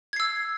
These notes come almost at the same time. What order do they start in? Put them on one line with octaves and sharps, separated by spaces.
G#6 C7 E6